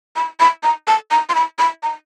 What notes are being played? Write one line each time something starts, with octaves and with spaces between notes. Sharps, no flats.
B5
B5
A#5
A5
A#5
C6
B5
B5
A#5